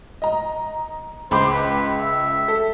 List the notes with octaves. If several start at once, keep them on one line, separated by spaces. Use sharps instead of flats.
D#5 A#5
C#2 C5 B5 D6
B4
E5
A4